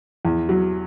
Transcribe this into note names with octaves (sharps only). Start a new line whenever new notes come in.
E2
F#3